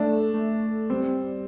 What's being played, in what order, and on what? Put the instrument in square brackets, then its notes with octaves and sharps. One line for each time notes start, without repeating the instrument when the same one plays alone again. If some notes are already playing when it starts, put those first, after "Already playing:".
Already playing: [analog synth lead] A3 [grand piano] D4
[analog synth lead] A3
[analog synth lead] G3 [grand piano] C4